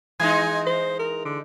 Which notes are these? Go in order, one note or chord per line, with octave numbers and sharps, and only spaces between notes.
E3 G#3 D#4 G#5
C5
A#4
D3